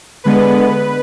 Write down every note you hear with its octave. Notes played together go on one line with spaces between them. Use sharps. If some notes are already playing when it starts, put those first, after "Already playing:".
D3 G#3 B3 B4